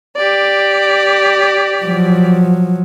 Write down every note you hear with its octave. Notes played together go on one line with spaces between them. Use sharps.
G4 D5
F3 F#3